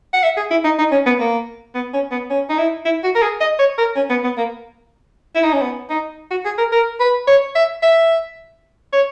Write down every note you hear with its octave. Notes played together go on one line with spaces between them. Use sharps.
F#5
E5
G#4
E4
D#4
D#4
C#4
B3
A#3
B3
C#4
B3
C#4
D#4
E4
E4
F#4
A#4
G#4
D#5
C#5
A#4
C#4
B3
B3
A#3
E4
D#4
C#4
B3
D#4
F#4
G#4
A#4
A#4
B4
C#5
E5
E5
C#5